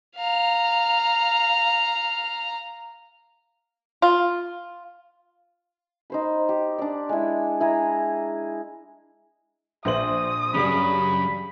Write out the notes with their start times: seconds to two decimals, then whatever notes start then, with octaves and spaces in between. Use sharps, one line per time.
0.16 F5 A#5
4.02 F4
6.10 D#4 C5 B5
6.49 G4
6.78 D4 D5
7.09 G#3 E4
7.60 E4 G#4 A#5
9.85 A#1 C5 D#6 F#7
10.54 G2 C#3 F#3 G3 C#4 B5